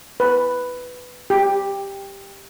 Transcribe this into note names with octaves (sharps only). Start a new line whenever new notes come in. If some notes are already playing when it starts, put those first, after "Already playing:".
B4
G4